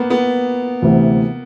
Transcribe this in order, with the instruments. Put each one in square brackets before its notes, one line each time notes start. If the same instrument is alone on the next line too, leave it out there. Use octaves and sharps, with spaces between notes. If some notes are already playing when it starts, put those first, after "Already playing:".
Already playing: [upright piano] A#3 B3
B3
[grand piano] D2 C3 E3